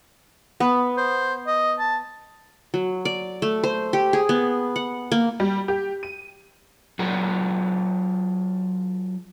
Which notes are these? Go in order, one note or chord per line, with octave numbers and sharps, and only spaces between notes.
B3
C5
D#5
A5
F#3
D5
A3
C5
G4
G#4
B3
F#5
A#3
G3
G4
D#7
F#3 F4 G#4 A#4 D5 F#5